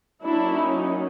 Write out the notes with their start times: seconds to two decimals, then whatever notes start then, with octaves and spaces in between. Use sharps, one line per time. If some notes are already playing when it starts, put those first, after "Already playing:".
0.22 F#3 A#3 C#4 D4 E4
0.55 D#4